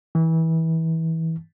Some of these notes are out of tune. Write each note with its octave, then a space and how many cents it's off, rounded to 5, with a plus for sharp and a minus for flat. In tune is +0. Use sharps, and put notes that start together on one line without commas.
E3 -25